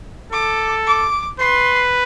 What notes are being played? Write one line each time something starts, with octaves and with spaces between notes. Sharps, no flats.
A4 D6
D6
B4 C6